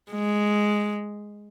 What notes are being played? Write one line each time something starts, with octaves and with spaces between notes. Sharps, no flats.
G#3